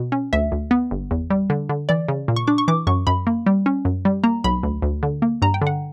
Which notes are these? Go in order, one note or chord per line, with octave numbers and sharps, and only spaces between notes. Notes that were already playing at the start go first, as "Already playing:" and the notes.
Already playing: B2
C#4
D2 E5
D2
B3
G1
E2
G3
D3
D3
E3 D5
C#3
A#2
C#6
D4 D6
C#6
E3 D6
F#2 C#6
F#2 B5
A#3
G3
C#4
F#2
G3
A#3 A#5
B1 B5
D2
D2
D3
A#3
G2 A#5
G5
D3
F#5